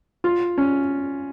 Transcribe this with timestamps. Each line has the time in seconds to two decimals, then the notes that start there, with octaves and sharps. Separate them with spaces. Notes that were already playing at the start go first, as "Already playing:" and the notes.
0.24 F4
0.58 C#4